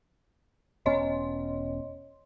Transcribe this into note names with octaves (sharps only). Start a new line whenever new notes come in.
E1 B3 C#4 C#5 D#5 C6